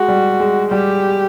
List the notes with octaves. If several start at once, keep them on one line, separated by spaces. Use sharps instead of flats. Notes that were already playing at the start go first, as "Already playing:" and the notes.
Already playing: G#3 F#4
G3
G#3
G3 G4